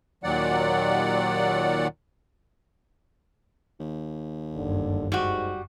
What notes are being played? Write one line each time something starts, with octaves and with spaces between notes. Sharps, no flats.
D#2 A#2 D#3 F#3 D5 F#5
D#2
F#1 C#2 G2 D3
G#2 G3 F#4